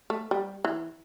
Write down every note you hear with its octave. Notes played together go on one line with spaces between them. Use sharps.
A3
G3
E3